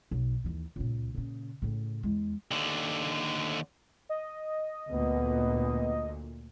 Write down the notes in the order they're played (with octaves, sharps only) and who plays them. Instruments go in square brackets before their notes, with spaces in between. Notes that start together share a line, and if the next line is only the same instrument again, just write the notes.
[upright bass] B1
D#2 E3
C#2 A#2
A#2 C#3
A2 C#3
E2 G#3
[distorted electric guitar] D#2 D3
[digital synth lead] D#5
[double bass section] D2 A#2 [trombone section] B3